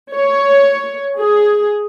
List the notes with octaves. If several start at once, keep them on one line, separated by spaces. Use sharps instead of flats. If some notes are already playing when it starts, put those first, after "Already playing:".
C#5
G#4